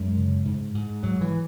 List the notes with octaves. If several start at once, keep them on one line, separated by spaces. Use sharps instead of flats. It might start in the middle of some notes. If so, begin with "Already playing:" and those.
Already playing: F#2 G#3
C#3
G#2
G#2
G#2 F#3
E3